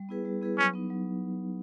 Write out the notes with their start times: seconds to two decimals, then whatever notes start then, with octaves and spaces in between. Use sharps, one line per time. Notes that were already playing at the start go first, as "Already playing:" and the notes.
Already playing: G3
0.09 B3 E4 G#4 B4
0.25 G3
0.41 B3 E4 G#4 B4
0.58 F#3 C#4
0.73 B3 D#4
0.90 F#3